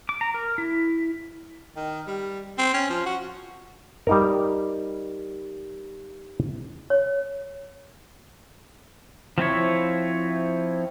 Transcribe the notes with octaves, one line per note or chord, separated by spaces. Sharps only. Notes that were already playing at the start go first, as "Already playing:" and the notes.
D6
A#5
A#4
E4
D#3
G3
C4
C#4
F3
F#4
G3 D#4 A#4
C#5
F3 C4 E4 C#5